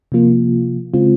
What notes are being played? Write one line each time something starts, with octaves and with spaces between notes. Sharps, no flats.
C3 F3 A#3 F4
C#3 G#3 C4 F4